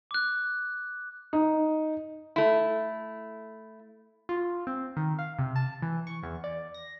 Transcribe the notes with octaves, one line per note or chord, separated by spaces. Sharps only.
D6 F#6
D#4
A3 E4
F4
C4
D#3
F5
C3
A5
E3
C#6
E2
D5
A#6